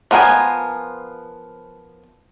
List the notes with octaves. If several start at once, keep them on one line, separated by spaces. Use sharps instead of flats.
F3 B3 A#4 C5 G#5